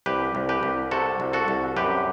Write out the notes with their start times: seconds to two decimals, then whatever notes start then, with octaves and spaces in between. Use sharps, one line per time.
0.06 C2 G4 B4
0.35 C2
0.49 G4 B4
0.63 C2
0.91 C3 F#4 A4
1.20 C2
1.33 F#4 A4
1.48 C2
1.77 F#2 G4 B4